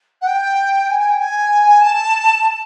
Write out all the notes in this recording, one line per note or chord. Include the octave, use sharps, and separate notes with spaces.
F#5
G5
G#5
G#5
G5
G#5
A5